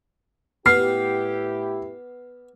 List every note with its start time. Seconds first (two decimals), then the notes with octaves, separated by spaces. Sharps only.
0.66 A2 B3 E4 G4 F6 C7